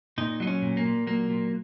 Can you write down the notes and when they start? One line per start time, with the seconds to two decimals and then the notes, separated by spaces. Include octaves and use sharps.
0.18 A#2 D#4
0.40 F#3 D#4
0.47 C#4
0.62 A#2
0.77 A#3
0.85 A#2
1.07 F#3 A#3
1.30 A#2